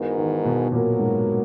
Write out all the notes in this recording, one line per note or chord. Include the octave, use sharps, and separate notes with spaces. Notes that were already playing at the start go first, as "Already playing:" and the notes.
Already playing: G#2 E3 B3 F#4 A#4
D#3
B2
A#2 F#3 B3 F#4 A#4
G#2